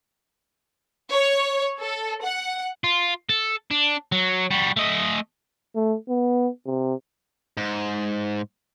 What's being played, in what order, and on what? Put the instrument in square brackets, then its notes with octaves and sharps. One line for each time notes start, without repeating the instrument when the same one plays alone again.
[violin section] C#5
A4
F#5
[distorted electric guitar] F4
A4
D4
F#3
G3 F#4
A3 D#5
[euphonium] A3
B3
C3
[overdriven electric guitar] G#2